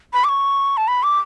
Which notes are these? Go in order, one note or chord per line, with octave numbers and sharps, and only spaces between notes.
B5
D6
C#6
A5
B5
D6